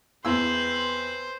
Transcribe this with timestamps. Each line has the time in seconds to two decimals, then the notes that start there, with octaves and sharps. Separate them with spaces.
0.25 E2 C4 B4 C5 E6